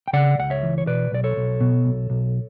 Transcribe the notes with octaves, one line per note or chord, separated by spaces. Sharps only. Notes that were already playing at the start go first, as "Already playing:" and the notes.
G5
C#3 D5 F#5
C#2 F#5
C#5 E5
E3
C#5
B2 B4 D5
B1 D5
A4 C#5
B1
B2
B1
B1